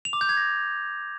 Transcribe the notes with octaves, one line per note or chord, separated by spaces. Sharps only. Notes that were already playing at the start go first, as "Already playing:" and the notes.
F7
D6
G6
G#6
A#6